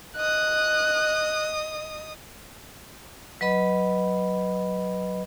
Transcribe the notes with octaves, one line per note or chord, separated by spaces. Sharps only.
D#5 D#6 F#6
F#3 B4 D#5 B5